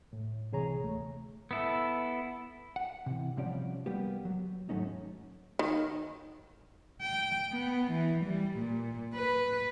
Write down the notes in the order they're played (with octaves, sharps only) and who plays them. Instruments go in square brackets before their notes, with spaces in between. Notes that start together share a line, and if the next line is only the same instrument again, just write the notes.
[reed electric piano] A2
C2 C3 E3 G#4 C#5 A#5
D2 A3
[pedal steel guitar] B3 E4 A4
[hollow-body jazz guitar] F#5
C3 E3
C3 F3 G3 C#4 D5 F#5
G3 A#3 B3 G4
F#3
D#2 G#2 F#3 A3 C#4 D#4
[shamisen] D#3
[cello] G5
B3
E3
G3
A#2
B4